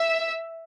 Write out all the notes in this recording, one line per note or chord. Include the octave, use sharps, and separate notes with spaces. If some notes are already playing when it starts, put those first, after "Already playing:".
Already playing: E5